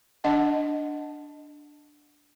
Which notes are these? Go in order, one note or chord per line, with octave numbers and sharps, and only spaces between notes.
D4 D#5 F#5 A5